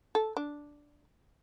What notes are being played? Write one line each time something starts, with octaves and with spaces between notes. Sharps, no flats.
A4
D4